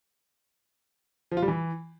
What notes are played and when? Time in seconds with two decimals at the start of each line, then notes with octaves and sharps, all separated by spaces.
1.31 F3
1.37 F4
1.42 G3
1.48 E3